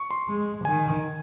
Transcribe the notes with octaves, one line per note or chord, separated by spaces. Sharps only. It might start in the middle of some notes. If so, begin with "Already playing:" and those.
Already playing: C#6
C6
G#3
D#3 G#5